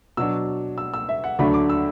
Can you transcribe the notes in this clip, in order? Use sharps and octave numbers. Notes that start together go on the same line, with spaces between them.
B2 F#3 D4 E6
E6
E6
E5
F#5
D2 D3 F#3 A3 D4 B5
D6
E6